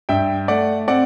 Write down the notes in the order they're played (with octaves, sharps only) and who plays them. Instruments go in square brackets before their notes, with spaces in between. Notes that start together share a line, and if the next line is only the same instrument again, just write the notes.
[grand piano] G2 E5 G5
A3 D5 F#5
C4 D5 F#5